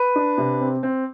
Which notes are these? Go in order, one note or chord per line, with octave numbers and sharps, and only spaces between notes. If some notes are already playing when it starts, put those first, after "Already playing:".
Already playing: B4
D4
C3
C4
C4